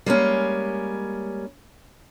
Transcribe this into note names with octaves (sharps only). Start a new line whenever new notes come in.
G3 G#3 A#3 C#4